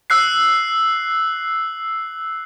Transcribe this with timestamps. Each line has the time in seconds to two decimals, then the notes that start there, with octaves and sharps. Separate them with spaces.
0.10 E6 F#6 C7